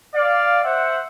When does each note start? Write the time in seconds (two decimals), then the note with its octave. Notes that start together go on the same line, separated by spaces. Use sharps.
0.14 D5 F5
0.64 C5 E5 F#5